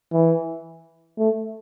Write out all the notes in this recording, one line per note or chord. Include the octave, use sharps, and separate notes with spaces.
E3
A3